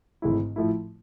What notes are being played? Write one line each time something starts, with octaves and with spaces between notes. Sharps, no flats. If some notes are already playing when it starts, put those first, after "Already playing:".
G#1 G#2 E3 A3 E4
A2 F3 A3 E4